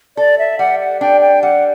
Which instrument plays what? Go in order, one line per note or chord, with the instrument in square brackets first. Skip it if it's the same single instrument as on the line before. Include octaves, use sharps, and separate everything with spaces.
[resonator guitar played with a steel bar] A4 [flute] D5
[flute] E5
[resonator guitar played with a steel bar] G3 [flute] F#5
[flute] F#5
[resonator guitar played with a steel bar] D4 [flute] G5
[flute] G5
[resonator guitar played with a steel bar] G3 [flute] F#5